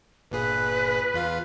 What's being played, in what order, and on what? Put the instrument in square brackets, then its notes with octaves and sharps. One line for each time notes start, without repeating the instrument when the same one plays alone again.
[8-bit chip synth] G1 A#2 G#4 [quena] B4
[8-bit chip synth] E2 F4 F5